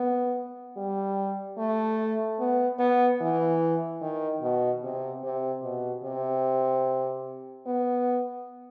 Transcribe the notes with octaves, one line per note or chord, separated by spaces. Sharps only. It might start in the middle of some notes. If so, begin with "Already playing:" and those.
Already playing: B3
G3
A3
B3
B3
E3
D#3
B2
C3
C3
B2
C3
B3